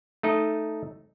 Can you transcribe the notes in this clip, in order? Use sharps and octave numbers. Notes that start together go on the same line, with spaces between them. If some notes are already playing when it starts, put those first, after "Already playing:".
A3 D#4 D#5